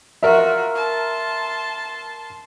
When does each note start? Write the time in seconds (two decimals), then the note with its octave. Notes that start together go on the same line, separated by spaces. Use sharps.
0.23 F4 F#4 A#4 E5
0.75 A5 C6